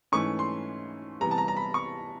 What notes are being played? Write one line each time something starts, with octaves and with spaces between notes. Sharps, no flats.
G#2 E3 A3 C#4 C#6
C6
C3 E3 G3 B3 A#5
A5
A#5
A#5
B5
C#6